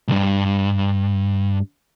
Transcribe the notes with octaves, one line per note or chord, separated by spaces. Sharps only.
B1 G2